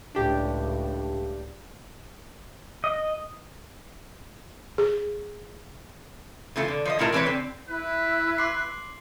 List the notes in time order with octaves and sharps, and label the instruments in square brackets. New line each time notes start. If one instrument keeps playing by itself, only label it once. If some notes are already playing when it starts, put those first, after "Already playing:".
[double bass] C#2 A2 [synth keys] D4 G4
[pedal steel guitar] D#5
[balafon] G#4
[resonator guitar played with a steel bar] C#3 E3 A3 F4
D3
F3 C5 D#5
A2 A3 E4 F4 A#4 A5
E3 G#3 C4 G#4 B4 C#5
D3 C4
[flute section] E4 [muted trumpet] B4
[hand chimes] C6 D6 C7